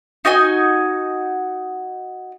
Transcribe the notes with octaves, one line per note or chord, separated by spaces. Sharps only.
D#4 F#4 D#5 G#5